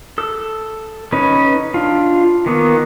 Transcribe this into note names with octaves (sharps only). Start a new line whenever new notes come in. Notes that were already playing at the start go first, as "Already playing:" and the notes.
A4 E6
C#4 D#4 B4 C#5
D4 F4
D#3 A#3 B3